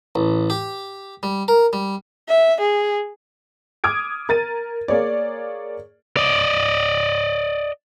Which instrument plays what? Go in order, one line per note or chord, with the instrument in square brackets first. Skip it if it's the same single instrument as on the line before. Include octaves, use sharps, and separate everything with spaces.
[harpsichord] A1
G4
G3
A#4
G3
[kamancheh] E5
G#4
[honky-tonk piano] D6 D#6 F6 G#6 D7
A#4 A6 D#7
A#3 G#4 C#5 D5
[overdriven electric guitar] D5 D#5